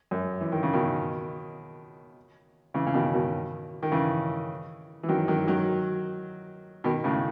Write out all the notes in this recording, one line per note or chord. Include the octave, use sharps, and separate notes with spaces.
F#2
E3
D#3
C#3
B2 D#3
C#3 E3
C#3
B2 D#3
B2 D#3
D#3
C#3 E3
E3
D#3 F#3
D#3 F#3
D#3 F#3
B2 D#3
A2 C#3